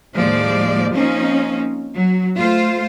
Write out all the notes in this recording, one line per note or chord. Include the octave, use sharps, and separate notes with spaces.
D#2 A2 F3 G#3 D5
F3 A#3 C4 C#4 D#4
F#3
A3 F4 C5